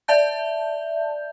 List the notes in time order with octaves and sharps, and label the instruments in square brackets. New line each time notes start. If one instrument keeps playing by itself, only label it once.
[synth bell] D5 E5 A5 G6